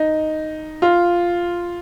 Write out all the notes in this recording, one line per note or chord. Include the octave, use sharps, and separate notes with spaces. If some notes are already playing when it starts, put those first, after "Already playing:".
Already playing: D#4
F4